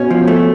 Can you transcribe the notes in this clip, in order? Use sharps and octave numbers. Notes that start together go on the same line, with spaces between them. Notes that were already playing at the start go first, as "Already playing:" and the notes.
Already playing: B2 C#4
F3
A3